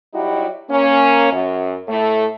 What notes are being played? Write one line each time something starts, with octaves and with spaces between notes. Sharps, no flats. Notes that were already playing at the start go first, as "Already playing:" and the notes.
F#3 G3 D#4 E4 F#4 G4
A#3 C#4
F#2
A2 A3